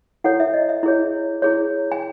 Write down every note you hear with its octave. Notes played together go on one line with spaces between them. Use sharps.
E4 A4 C#5 F#5
E5
D#5
E5
E4 G#4 C#5
E4 G#4 C#5
G#5